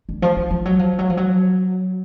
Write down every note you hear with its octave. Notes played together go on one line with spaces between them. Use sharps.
D3
F3
F3
F3
F#3
F3
F#3
F3
F#3